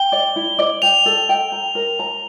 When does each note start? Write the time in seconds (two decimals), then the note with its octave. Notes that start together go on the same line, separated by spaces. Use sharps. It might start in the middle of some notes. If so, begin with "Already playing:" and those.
Already playing: G5 G7
0.12 D5
0.36 E4
0.59 D5
0.82 G5 F7
1.06 A4
1.29 G5
1.52 A#5
1.75 A#4
1.99 A#5